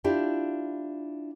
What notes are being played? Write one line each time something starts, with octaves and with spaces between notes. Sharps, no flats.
D4 E4 F4 G4